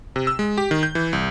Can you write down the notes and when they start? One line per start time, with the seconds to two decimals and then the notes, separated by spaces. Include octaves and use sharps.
0.16 C3
0.27 E6
0.39 G#3
0.58 G4
0.71 D#3
0.83 G6
0.95 E3
1.13 C2